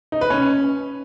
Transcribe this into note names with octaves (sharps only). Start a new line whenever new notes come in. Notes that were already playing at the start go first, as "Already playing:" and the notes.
D#4
B4
C#4